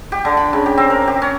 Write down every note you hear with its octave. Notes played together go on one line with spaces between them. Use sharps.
G4
D3
B5
C#3
G4
C4
A#4
G4
C#4